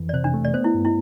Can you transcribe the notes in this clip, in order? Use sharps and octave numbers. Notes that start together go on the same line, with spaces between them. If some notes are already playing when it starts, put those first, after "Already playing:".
Already playing: F2 E3
D5
C3 C5
D4
A3
D5
B3 C5
E4
G2
E4